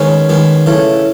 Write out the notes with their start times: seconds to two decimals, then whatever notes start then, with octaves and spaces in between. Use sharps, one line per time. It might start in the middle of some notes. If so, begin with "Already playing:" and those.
Already playing: D#3 G#3 B3 C#4
0.29 D#3 G#3 B3
0.66 C#3 E3 A3